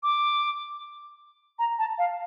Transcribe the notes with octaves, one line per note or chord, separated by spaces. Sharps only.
D6
A#5
A5
F5